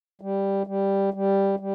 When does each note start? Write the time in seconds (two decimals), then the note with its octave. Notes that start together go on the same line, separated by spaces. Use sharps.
0.21 G3
0.67 G3
1.14 G3
1.59 G3